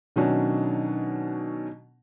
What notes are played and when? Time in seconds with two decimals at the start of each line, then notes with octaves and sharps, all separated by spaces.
0.16 B2 D#3 F#3 C#4 D4